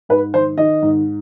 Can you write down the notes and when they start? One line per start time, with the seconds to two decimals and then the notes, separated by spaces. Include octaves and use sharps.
0.09 G#2 B4
0.34 D#3 C5
0.58 D#3 D#5
0.82 G#2